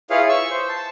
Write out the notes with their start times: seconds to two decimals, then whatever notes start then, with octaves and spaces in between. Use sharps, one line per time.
0.10 E4 F4 G#4 B4 C#5 F5
0.29 C#6 E6
0.50 C5
0.69 A5